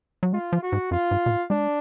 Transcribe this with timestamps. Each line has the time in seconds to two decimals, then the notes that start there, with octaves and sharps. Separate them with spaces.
0.23 F#3
0.33 G#3 F4
0.53 F3
0.62 F#4
0.72 G#2
0.91 F#2 F4
1.11 G#2
1.26 B2
1.30 A2
1.50 G#3 D4